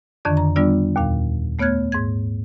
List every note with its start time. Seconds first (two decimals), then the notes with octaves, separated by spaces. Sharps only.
0.25 F2 D3 D#3 D4 D5 C#6
0.37 A#5
0.56 G3 B3 D4 F4 D5 E6
0.96 D#2 A#2 F5
1.59 A3 B3 C#5 F6 F#6 G#6
1.92 G#2 G#6